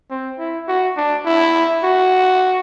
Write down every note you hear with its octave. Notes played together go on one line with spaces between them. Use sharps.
C4
E4
F#4
D4
E4
F#4